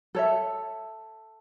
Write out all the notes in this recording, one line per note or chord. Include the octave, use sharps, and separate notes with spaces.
A4 C#5 E5